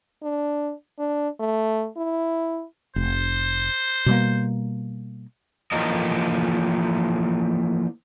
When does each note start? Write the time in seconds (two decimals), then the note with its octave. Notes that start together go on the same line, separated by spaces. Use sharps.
0.22 D4
0.99 D4
1.40 A3
1.97 E4
2.96 F1 C5
4.06 B2 G3 A#3
5.72 E3 F3 A3 A#3 A#4 D#5